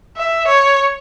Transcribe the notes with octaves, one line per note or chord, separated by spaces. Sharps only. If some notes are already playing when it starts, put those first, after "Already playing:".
E5
C#5